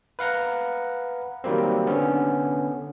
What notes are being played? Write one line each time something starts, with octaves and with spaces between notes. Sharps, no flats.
B4 F5 F#5 A#5
D#3 F#3 G3 A#3 C4
D3 B3 C#4